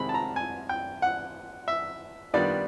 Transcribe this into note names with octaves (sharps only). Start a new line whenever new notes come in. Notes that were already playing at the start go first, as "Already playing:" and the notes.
Already playing: C3 D#3 G#3 C4 B5
A5
A#5
G#5
G5
F#5
E5
D#3 G3 B3 D4 F4 D5